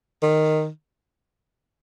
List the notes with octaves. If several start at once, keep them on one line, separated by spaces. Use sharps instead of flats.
D#3